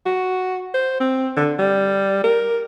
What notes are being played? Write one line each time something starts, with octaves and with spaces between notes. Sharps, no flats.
F#4
C5
C4
D3
G3
A#4